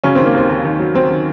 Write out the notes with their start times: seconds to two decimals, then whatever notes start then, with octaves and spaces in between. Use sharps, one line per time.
0.04 C#3 F#3 C#4
0.15 D#3 C4
0.26 A#3
0.34 D#2 C4
0.49 D#2
0.65 D#3
0.79 F#3
0.95 F#3 C4
1.10 D#3